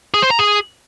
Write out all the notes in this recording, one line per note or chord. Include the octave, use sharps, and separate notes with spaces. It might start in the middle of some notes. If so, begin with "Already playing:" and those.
G#4
C5
A#5
G#4